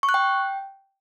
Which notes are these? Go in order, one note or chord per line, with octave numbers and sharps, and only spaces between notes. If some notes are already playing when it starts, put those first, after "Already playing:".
C#6
F#6
G5